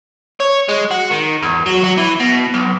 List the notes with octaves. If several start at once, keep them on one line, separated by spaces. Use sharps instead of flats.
C#5
G#3
F#4
D#3
E2
F#3
F#3
E3
B2
B1